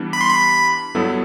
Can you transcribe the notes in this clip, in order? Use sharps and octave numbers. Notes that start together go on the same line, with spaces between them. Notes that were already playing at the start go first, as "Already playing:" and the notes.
Already playing: E3 G3 B3 D4
B5
C6
B5
G2 F#3 B3 E4 A4